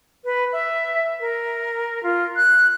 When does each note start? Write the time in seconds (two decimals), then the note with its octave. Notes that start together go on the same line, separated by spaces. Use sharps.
0.25 B4
0.53 E5
1.20 A#4
2.03 F4
2.36 F#6